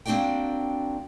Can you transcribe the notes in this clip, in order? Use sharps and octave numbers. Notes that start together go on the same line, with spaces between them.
A#3 C4 D4 F#4 D5 G5